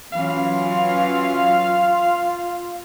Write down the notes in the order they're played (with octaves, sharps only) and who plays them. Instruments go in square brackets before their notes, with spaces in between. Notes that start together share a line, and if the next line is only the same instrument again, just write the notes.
[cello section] E3 F#3 C#4 [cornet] F4 [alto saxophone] F5